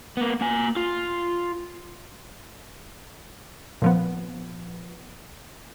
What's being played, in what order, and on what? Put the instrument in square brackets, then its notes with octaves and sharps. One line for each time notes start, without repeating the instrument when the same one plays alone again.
[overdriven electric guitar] A#3 B3
A#3 G#5
F4
[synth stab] A#2 F3 B3